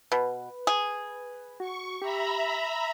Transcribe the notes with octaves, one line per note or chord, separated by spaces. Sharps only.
B2 B4
G#4
F#4 C#6
G4 E5 A#5 B5